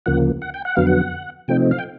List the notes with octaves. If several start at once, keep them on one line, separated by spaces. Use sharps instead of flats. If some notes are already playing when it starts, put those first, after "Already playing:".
D2 C#3 F3 A#3 F#5
F#5
G5
F#5
F2 D3 F#3 B3 F5
F#5
C3 F3 A3 C4 D#4 G5
F5
G5